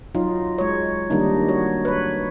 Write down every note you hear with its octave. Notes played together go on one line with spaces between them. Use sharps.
F#3 D#4 F4
G#3 C#5
D#3 G3 A#3 D4 D#4
F#4 C#5
B4 C#5